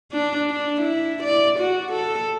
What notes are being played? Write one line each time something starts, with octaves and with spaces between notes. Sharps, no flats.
D4
D4
E4
D5
F#4
A4